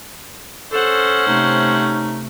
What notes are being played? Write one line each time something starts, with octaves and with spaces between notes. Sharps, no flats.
C#4 A4 C5 F#5
C3 A3 D#4